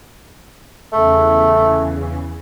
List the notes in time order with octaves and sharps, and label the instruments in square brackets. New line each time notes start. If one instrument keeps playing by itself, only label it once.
[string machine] E2 C#3 E3 [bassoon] A3